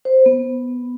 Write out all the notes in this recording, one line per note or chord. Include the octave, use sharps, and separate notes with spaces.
C5
B3